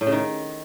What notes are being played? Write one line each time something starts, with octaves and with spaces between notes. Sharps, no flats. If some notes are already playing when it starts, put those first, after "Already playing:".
A2
C#3
D#3